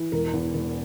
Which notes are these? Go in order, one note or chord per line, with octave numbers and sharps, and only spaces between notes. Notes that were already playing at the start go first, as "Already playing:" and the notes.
Already playing: E3
E1 A#4
E2
E1